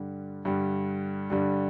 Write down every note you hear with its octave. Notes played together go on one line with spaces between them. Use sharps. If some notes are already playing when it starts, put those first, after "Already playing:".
Already playing: G2 D3 G3
G2 D3 G3
G2 D3 G3